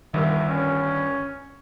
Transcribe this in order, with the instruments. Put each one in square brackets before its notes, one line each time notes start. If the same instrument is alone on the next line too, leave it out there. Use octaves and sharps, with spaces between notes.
[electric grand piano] G1 G2 A#4 [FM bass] D#3 [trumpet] E5
[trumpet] C#4